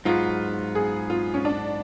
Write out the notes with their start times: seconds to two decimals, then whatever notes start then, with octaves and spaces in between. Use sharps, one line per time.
0.05 G#2 F#3 B3 F4
0.75 G#4
1.10 F4
1.34 C#4
1.45 D4